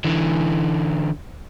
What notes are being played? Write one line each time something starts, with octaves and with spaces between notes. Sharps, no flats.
D3 E3